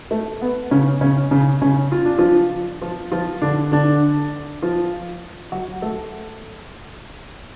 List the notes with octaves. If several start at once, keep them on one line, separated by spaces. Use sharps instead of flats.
A3
B3
C#3 C#4
C#3 C#4
C#3 C#4
C#3 C#4
F4
D4
F3 F4
F3 F4
F3 F4
D3 D4
D3 D4
F3 F4
F#3 F#4
A3 A4